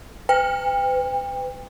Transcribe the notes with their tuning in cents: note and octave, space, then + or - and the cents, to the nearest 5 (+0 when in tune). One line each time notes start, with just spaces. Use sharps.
B4 +40 G5 +35